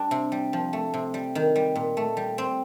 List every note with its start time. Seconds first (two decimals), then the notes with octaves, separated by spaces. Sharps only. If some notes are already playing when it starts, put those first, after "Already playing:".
Already playing: G3 D4
0.11 C3
0.32 G3
0.53 F3
0.73 A3
0.94 C3
1.14 G3
1.35 D#3
1.56 G3
1.76 A#2
1.97 A3
2.17 G3
2.38 C4